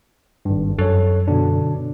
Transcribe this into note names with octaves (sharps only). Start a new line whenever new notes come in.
G#1 G2
F#2 A4 C#5
B2 D3 D4